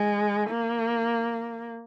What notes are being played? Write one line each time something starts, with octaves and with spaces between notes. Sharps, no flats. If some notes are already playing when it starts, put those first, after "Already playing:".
Already playing: G#3
A#3